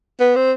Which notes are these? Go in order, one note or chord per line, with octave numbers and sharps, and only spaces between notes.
B3
C4